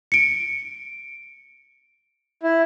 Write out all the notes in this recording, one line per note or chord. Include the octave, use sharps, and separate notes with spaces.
C#7 D7
E4